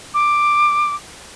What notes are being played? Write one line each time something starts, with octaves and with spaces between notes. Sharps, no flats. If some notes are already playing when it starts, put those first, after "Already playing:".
D6